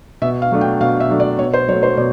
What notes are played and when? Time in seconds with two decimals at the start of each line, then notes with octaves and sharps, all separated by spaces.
0.22 B2 E5
0.42 F5
0.51 F#3 A3 D4
0.61 G5
0.81 B2 F5
1.00 E5
1.10 F#3 A3 D4
1.20 D5
1.39 B2 C#5
1.54 C5
1.68 F#3 C#5
1.72 A3
1.83 C5
1.97 B2 D5